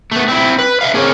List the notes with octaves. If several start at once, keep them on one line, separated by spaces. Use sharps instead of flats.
A3 B3
C4 E4
B4
B4 E5 F5
C4 G#4 A#4 C#5